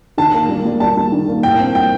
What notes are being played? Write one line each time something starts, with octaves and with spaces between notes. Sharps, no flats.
D#3 A5
A#3
G3
G3
G3 A5
G3
D#3
A#3
A2 G5
C4
G3 G5